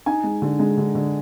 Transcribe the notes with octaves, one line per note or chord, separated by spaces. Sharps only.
D#4 G#5
G#3
D3
G#3
D3
D3